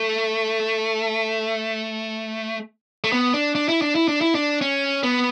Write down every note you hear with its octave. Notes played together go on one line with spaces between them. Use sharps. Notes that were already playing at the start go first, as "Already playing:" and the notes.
Already playing: A3
A3
B3
D4
D4
E4
D4
E4
D4
E4
D4
C#4
B3